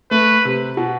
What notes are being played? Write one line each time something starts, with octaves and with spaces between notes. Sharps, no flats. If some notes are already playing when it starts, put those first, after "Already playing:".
A3 B4
C3
B2